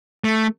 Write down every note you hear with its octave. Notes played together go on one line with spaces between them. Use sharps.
A3